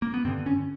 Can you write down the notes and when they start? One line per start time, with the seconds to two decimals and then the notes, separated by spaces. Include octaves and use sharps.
0.02 A#3
0.14 B3
0.25 G2 D3 C4
0.46 C#4